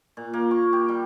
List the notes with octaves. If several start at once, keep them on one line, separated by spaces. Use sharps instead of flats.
A#2
A#3
C#6
G4
G3